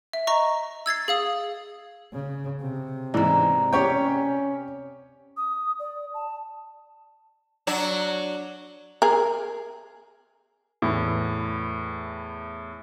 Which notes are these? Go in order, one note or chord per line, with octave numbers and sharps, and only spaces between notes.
E5
D#5 A#5 C#6
E6 G#6 A6 C7
G#4 F5 D#6
C#3
C3
G#2 E3 D5 A#5
C#4 G4 C#5 G5
D#6
D5
A5
F#3 D4 F#4
G#4 A#4
E2 A2